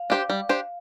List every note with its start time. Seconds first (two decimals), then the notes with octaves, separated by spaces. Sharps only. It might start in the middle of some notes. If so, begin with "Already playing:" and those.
Already playing: F5
0.10 D4 G4 C5
0.30 G3
0.49 D4 G4 C5